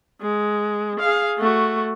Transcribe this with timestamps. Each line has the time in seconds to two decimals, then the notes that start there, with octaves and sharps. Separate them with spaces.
0.21 G#3
1.00 G#4 F5
1.38 A3 F#4